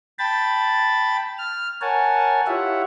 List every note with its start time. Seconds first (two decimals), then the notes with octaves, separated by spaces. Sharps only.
0.19 G5 A5 B5 A6
1.39 F6
1.81 A#4 C#5 F#5 G#5 A5
2.47 E4 F4 G4 C#5 E5 F#5